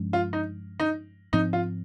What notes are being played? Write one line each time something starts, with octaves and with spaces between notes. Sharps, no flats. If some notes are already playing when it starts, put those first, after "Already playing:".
Already playing: G2 F3 G#3 C#4
F4
D#4
D#4
G#2 F3 C4 D#4
F4